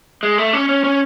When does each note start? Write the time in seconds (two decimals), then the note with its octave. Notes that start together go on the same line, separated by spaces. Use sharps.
0.23 G#3
0.38 A3
0.53 C#4
0.69 C#4
0.84 C#4